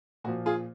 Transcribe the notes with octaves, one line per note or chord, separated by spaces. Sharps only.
A#2 F3 F#4
F4 G#4